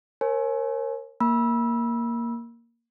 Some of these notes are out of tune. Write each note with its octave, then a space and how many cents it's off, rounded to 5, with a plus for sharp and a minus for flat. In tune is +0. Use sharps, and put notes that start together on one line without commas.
A#4 +0 C#5 -45 G#5 +25
A#3 +0 B5 -30 E6 +0